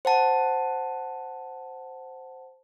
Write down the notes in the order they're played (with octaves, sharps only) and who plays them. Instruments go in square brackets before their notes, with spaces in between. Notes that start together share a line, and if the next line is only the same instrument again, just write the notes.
[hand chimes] C5 F#5 A5